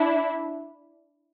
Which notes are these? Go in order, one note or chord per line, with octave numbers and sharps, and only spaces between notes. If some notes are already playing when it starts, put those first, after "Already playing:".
Already playing: D4 E4